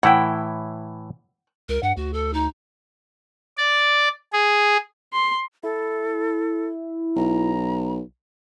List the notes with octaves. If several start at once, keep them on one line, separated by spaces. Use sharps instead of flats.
A2 E3 E4 F#5 G5
C#2 A#4
G2 F#5
D2 F#4
A4
D#4
D5
G#4
C6
E4 A4
B1 A#5